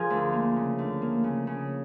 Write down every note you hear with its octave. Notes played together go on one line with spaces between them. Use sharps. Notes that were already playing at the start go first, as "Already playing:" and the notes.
Already playing: F3 G#4 A#4
D2
A#3
C#3
D2
A#3
C#3
C#3